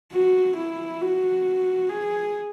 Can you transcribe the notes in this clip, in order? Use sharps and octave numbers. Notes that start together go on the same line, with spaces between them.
F#4
E4
F#4
G#4